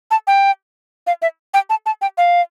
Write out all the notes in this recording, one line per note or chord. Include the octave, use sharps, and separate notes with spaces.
A5
G5
F5
E5
G5
A5
A5
G5
F5